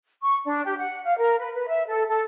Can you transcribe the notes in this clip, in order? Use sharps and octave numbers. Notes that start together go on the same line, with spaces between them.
C#6
D4
G4
F#5
F5
A#4
B4
B4
E5
A4
A4